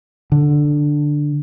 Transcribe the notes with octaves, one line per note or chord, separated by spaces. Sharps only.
D3